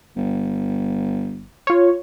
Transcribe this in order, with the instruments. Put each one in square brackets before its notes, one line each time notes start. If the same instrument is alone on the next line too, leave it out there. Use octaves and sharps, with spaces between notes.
[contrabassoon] G1
[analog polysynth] F4 C#5